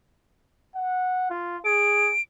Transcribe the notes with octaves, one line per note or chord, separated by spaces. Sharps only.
F#5
F4
G#4 D7